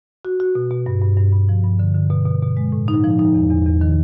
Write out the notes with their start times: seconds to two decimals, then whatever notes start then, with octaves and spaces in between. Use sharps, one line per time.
0.25 F#4
0.40 F#4
0.55 B2
0.71 B2
0.86 G2
1.02 G2
1.17 G2
1.33 G2
1.49 F3
1.64 G2
1.79 D3
1.95 D3
2.10 B2
2.26 B2
2.42 B2
2.57 G#3
2.72 A2
2.88 D#4
3.04 F3
3.19 D#4
3.35 E2
3.50 E2
3.66 E2
3.81 D#3